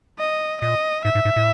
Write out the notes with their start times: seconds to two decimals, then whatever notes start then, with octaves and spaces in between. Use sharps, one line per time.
0.19 D#5
0.61 A#2 D#5
1.04 G#2 E5
1.15 G#2
1.25 G#2
1.36 A2